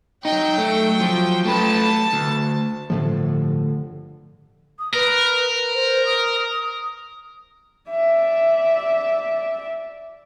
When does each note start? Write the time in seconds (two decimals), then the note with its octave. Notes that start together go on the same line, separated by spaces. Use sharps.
0.25 F#3 D#4 G5
0.58 A3
1.01 F3
1.45 A3 B4 A5
2.13 D2
2.90 G1 A2 D3 F3
4.79 D#6
4.93 A#4 B4
5.74 C5
6.06 D#6
7.90 D5 E5